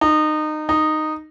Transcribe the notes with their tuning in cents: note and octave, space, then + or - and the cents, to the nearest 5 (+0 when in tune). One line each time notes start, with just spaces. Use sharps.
D#4 -25
D#4 -10